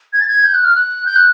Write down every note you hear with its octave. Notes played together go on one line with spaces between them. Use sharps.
G#6
A6
G#6
G6
F#6
F6
F#6
G6
F#6